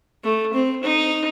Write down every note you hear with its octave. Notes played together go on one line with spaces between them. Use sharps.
A3
C4
D#4